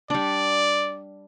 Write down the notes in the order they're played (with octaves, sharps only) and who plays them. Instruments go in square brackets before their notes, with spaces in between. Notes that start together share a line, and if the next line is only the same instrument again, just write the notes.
[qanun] G3 D4 [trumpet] D5